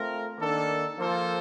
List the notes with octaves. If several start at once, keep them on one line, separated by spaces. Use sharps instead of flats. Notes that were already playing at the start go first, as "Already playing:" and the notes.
Already playing: A3 C4 F4 A#4
D#3 A#3 D4 A4
F3 A#3 F4 A4 C5